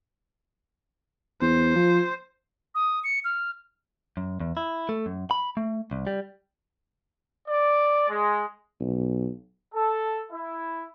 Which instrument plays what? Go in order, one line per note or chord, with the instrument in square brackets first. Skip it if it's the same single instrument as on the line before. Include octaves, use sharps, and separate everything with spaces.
[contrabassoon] E2 [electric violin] C5
[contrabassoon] F3
[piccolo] D#6
C#7
F6
[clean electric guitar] F#2
E2
E4
A3
F#2
B5
A3
C2
G3
[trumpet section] D5
G#3
[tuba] B1
[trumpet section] A4
E4